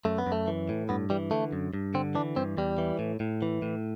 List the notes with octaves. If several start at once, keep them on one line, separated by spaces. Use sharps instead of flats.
F#2 A3
B3
F#2
A3
E3
A2
G2 B3
E3 G3
D3 A3
F#2
G2
D3 C4
E3 D4
G2 C4
E2 G3
E3
A2
A2
E3
A2